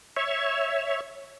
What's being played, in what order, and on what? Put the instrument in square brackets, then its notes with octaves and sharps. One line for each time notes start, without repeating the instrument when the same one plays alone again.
[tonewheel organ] C#5 E5